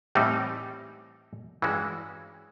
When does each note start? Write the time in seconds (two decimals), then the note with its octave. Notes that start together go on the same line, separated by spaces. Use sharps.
0.15 A2 E3 G3 C4 D#4
1.62 G2 E3 G#3 C#4 F#4